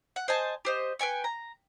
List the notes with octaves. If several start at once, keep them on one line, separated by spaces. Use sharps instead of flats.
F#5
C5 D#5 G#5 A5
G4 C5 D#5
B4 G5 G#5 C#6
A#5